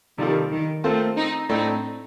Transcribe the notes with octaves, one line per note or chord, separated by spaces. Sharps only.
C3 D#3 F3 G3 A#3 F4 A4
D#3
A3 A#3 C4 F4 A4 C5
C4 D#4
A2 A3 C4 D4 D#4